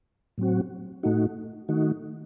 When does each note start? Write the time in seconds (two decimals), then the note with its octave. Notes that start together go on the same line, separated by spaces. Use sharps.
0.38 A2 F#3 C4 F#4
1.03 A2 A3 D#4 F#4
1.69 D#3 A3 D#4 F#4